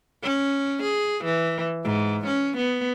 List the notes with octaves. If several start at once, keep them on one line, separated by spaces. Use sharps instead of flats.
C#4
G#4
E3
G#2
C#4
B3